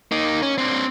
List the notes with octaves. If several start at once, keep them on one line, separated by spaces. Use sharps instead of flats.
A#3 D#4
C#4
C4 D4